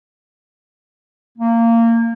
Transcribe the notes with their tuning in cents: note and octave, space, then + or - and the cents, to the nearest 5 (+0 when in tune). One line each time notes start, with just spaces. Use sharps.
A#3 -20